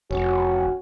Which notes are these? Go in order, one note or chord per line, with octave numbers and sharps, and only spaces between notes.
F1 C#4 F#4